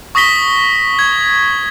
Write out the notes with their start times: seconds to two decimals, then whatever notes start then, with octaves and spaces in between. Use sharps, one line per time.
0.15 C#6 D#6 A#6 B6 G7
0.99 G#6